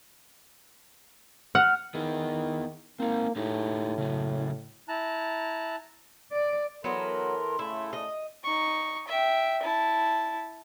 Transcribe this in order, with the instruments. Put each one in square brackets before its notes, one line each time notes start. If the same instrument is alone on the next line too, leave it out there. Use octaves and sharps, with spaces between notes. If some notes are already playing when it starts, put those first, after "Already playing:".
[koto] F#5 [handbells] F6
[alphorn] D#3 [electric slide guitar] B3 E4 G#4
[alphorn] A#3 [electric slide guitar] C4 D#4
[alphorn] A2 [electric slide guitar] D#4 G4 G#4
[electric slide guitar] C#3 F#3
[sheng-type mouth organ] E4 A5 A#5 F#6
[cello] D5
[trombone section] E3 A4 A#4 [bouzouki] F#3 B3 [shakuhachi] C6
[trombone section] A2 C#3 A3 [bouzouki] E4
[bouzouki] D#5
[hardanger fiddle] D#4 C#6
E5 G5
E4 A5